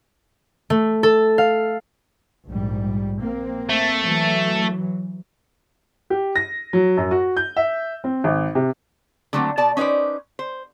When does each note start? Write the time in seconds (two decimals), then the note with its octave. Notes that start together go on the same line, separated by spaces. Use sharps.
0.70 A3
1.03 A4
1.38 F5
2.46 A#1 G#2 G3
3.19 A#3 C4
3.69 A3
4.03 E3 F#3
6.10 G4
6.36 A#6
6.73 F#3
6.97 F#2
7.11 F#4
7.37 G6
7.57 E5
8.04 C4
8.24 G#1
8.55 C3
9.33 D3 F#3 A3 A#3 C4
9.58 B2 D5 A5
9.77 C#4 D#4 B4 C5 D5
10.39 C5